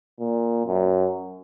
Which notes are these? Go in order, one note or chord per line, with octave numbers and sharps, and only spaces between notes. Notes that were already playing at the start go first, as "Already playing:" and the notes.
A#2
F#2